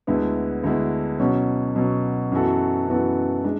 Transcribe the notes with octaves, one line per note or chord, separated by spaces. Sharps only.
D2 D3 G#3 B3 E4
D2 D3 G#3 B3 E4
B2 F#3 C#4
B2 F#3 C#4
F#2 E3 B3 F#4 A4
F#2 E3 B3 F#4 A4
G#3 D4